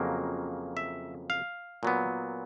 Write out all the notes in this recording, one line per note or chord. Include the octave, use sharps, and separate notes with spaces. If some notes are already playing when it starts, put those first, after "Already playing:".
Already playing: F2 C#3 F#3 A#3
E5
F5
A#2 F#3 B3